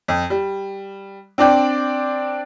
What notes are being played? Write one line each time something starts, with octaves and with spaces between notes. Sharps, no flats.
F2
G3
C4 D4 D5 G5